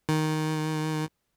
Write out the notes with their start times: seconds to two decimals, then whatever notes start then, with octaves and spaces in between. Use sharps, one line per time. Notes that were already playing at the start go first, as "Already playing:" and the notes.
0.09 D#3